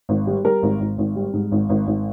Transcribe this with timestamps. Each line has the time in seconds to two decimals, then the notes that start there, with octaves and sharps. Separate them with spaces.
0.09 G#1
0.27 G3
0.44 G3 A#4
0.63 G#1
0.80 G#1
0.98 G#1
1.16 G3
1.33 G#2
1.51 G#1
1.69 G#1
1.87 G#1